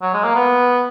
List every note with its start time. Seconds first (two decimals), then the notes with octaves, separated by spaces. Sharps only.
0.02 F#3
0.14 G#3
0.24 A#3
0.35 B3